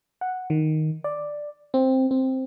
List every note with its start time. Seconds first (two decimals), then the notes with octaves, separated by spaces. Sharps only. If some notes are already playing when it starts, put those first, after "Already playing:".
0.21 F#5
0.50 D#3
1.04 D5
1.74 C4
2.11 C4